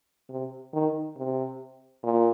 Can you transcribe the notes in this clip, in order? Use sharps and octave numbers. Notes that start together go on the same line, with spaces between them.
C3
D#3
C3
A#2